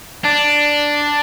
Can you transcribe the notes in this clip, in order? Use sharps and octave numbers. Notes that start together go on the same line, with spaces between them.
D4